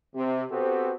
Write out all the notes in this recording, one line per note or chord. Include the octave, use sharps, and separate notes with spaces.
C3
B3 C4 F#4 G4 A4 C5